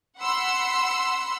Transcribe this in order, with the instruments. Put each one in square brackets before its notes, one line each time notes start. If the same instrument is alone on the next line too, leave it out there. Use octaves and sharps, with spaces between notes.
[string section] F#5 B5 C6 E6